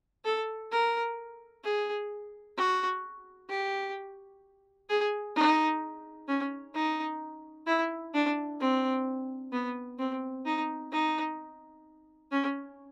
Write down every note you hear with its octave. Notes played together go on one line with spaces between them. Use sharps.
A4
A#4
G#4
F#4
G4
G#4
D#4
C#4
D#4
E4
D4
C4
B3
C4
D#4
D#4
C#4